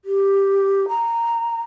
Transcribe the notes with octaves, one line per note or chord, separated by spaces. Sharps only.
G4
A#5